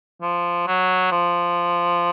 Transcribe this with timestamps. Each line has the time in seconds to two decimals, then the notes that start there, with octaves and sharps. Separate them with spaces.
0.22 F3
0.67 F#3
1.12 F3